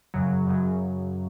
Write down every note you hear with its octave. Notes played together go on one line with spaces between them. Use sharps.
F#2 C#3 F#3
F#2 C#3 F#3